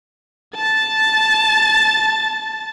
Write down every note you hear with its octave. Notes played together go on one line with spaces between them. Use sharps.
A5 A6